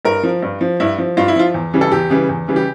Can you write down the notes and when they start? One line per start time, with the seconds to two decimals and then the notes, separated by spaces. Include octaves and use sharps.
0.05 G2 A#4
0.23 F3
0.42 G2
0.61 F3
0.80 G2 E4
0.98 F3
1.17 G2 F4
1.28 E4
1.36 F3 F4
1.54 E2
1.74 C#3 E3 G3
1.81 A4
1.91 E2 G4
2.10 C#3 E3 G3
2.29 E2
2.48 C#3 E3 G3
2.56 G4